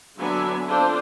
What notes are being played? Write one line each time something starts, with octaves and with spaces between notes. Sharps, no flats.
D3 F#3 B3 D4 E5 G#5
C4 D4 F4 A4 C5